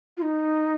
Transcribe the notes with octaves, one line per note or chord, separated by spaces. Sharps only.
F4
D#4